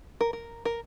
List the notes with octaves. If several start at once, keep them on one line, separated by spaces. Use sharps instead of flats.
A#4
A#4
A#4